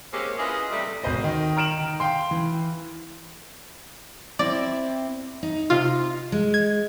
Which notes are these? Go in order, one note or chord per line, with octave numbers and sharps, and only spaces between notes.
G#3 A#3 C4 C#4 G4
C#4 E4 F4 G#4 B4 D#5
C3 G3 A3
G#1 B2 C5 D#5
D#3
A#5 F6 D7 E7 F#7
D#3
F5 G5 C6
E3
C4 E4 D5
D#4
C3 F4
G#3
G#6